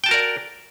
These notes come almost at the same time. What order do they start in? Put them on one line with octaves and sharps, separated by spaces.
G5 A5 F#4 A#4 D5